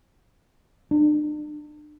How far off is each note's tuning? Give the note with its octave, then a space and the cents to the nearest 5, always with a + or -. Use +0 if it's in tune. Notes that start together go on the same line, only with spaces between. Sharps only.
D4 +40